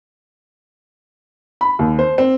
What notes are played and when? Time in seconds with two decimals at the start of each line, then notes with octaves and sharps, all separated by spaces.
1.61 B5
1.79 D#2
1.99 C5
2.18 C4